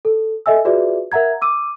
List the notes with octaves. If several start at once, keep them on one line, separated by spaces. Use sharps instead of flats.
A4
A4 D#5 E5 G#5 E6
F4 F#4 G#4 B4 D5 E5
A#4 E5 F#5 A#5 G#6
D6 E6 D#7